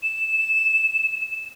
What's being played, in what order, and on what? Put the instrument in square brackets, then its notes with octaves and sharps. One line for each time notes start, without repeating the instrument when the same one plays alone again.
[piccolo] E7